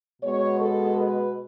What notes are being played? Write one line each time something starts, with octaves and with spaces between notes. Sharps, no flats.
B2 G#3 B3 C#5
A4
B4